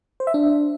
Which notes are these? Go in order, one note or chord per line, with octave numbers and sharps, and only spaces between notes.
C5
E5
D4